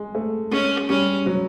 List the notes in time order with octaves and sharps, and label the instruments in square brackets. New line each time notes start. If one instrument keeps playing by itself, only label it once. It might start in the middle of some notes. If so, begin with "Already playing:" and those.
Already playing: [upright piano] G#3
A3
[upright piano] G#3 [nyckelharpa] C#4
[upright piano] G3 [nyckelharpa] C#4
[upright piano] F#3